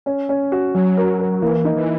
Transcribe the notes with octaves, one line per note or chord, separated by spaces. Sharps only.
C#4
C#4
F#4
F#3 C#4
A#4
A#4
E3 A#3
D#4
E3